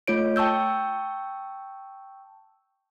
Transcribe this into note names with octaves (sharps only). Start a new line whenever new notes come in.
A3 F4 C#5 D7
G5 A5 C#6 E6 G6